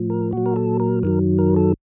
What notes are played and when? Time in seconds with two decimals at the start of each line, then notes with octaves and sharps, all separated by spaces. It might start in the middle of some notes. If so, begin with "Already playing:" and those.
Already playing: A2 F3
0.10 A#4
0.33 A#2 F#3 F#4
0.46 A#4
0.56 A4
0.80 A#4
1.03 F#2 D#3 F#3 A#4
1.39 A#4
1.56 A4